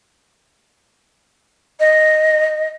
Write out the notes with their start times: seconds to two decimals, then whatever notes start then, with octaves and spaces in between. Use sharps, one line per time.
1.80 D#5